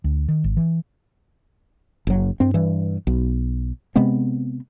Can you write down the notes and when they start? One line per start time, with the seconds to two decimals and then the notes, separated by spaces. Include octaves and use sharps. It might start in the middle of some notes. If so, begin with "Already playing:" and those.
0.04 D2
0.28 D#3
0.44 G#1
0.57 E3
2.07 F#1 F#3
2.40 G2 C4
2.54 G2 E3
3.07 B1
3.96 C3 G#3 B3 C4